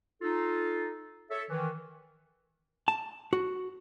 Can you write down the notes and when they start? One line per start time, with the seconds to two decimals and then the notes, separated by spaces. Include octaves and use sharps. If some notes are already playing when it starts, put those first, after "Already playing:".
0.22 D#4 F4 A4
1.30 A4 C#5 E5
1.49 D#3 E3
2.88 A5
3.33 F#4